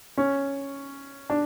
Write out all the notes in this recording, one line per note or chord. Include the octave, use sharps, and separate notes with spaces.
C#4
D4